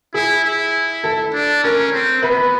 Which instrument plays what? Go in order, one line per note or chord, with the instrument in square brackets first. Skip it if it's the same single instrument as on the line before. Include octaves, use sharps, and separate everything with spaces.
[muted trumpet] E4 [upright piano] G#4
[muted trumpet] E4
[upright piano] A4
[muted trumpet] D4
[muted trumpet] C#4 [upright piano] A#4
[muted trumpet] C4
[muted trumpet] B3 [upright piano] B4